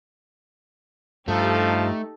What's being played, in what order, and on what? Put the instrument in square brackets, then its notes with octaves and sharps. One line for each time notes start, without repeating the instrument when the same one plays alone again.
[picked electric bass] G2 [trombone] F3 [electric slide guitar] A3 [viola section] D#4 G4 A4